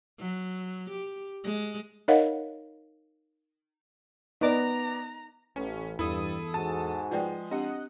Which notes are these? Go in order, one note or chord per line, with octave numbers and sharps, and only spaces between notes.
F#3
G4
G#3
D#4 A#4 C#5 D#5 F5 F#5
B3 D#4 D5 A#5 D6
A1 C#4
E2 G2 E4 A4 D#6
G#2 F#4 G#4 A5
F3 G#3 B4 D5 G5
C4 D4 G4 D#5 F#5